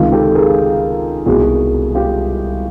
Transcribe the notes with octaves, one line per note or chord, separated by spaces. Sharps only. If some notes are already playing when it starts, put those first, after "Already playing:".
Already playing: C#2 C3 D#3 F4
G4 A4
G#4 A#4
C2 B2 F#4 G#4
F4 G4